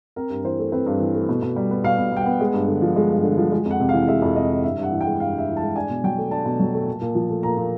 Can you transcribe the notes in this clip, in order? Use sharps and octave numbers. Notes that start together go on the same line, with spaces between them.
C4 A#4
G2
E3 C5
A3
C4 B4
G2
E3
A3
B2
B2
G3
B3
B2 F5
B2
G3 G5
B3 F#5
G#3
G2
D3
F3
G#3
G2
D3
F3
G#3
F2
F#5
C3
E3 F5
G#3 E5
F2
C3 D#5
E3
G2 E5
G2 F#5
E3
G5
G#3
G2 F5
G2 E5
E3
A5
G#3
D4 G#5
B2
F#3 G5
A3
D4 A5
B2
F#3
A3
A#2
A#2
F3
A3
A#2 A#5
A#2